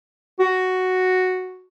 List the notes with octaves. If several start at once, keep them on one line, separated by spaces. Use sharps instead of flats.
F#4